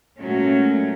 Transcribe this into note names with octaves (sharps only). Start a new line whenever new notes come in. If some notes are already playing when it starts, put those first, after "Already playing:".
A#2 F#3 G#3 A3 C#4